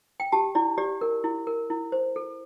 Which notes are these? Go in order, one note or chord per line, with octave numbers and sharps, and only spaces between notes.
G5
G4 A5
E4 D5
G4 D5
A#4
E4
A#4
E4
C5
A4